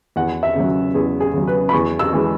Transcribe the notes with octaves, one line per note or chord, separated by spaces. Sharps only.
E2 F#5
E5
C#3 F#3
E2 G#4
G#4
C#3 F#3
B4
B5
E2 C#6
E6
E3 G#3